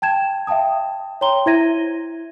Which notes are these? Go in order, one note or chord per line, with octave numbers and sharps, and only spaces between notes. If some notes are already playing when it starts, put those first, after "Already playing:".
G5 A5 G#6 E7
E5 F5 G5 A5 D#6
C#5 G5 A#5 C6 G7
E4 C5 E5 G#6 A#6 D#7